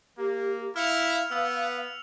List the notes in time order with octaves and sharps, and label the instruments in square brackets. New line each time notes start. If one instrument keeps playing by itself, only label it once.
[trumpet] A#3 [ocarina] G4
[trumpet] E4 [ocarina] F5 [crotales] F6 C#7 F7
[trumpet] B3 [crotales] E6